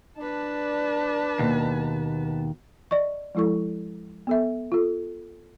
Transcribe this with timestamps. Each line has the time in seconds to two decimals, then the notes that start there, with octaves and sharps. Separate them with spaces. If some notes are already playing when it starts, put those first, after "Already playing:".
0.18 D4 B4 A5
1.39 D#2 B2 A#3
2.91 D5 D#5 C#6
3.35 F3 G#3 E4 A4 C#6
4.27 B3 A4 E5
4.72 F4 A4